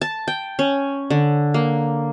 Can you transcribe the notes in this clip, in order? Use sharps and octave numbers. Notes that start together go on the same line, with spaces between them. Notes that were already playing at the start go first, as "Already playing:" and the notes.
A5
G5
C#4
D3
A#3